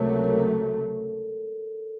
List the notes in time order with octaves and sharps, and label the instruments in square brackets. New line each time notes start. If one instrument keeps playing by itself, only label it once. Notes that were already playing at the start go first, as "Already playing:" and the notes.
Already playing: [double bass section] C#2 C3 F#3 A3 [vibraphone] A#4 C#5
[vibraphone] A4
A#4
A4